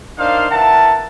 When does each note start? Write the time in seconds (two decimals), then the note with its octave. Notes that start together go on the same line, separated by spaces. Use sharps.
0.18 D4 D#4 A#4 C5 F5
0.50 E3 A#4 E5 F#5 A5